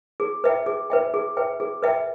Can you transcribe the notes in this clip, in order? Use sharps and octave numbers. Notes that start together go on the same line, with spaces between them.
G#4
B4 E5 G5
G#4
B4 E5 G5
G#4
B4 E5 G5
G#4
B4 E5 G5